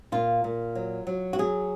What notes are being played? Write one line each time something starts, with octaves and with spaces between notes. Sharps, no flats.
A#2 F4
A#2
F#3
F#3
F#4
F#3 G#4